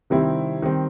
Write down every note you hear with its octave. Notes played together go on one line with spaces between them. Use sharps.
C3 D#3 G3 C4 E4
D#3 G3 C4